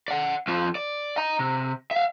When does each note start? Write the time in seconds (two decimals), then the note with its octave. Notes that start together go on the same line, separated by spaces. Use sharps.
0.08 D5 F#5
0.48 F2 F3
0.75 D5
1.17 D#5 A#5
1.39 C3
1.91 E5 F5